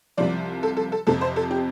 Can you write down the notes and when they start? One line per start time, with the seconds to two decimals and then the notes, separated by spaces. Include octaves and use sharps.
0.17 C2 C3 F3 D5
0.63 A4
0.77 A4
0.92 A4
1.07 F2 C3 F3 A4
1.21 C5
1.36 A4
1.51 G4